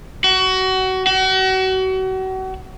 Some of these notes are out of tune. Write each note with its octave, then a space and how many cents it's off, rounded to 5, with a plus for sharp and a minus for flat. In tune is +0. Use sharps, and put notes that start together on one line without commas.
F#4 +25
F#4 +35